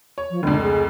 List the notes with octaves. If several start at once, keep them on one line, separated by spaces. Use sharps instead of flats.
C#5
F3
F1 C#2 D3
G#4